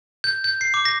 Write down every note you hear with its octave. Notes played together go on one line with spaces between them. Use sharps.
G6
G6
C7
D6
A#6